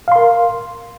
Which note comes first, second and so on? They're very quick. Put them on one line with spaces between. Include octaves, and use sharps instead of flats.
F5 C6 A#4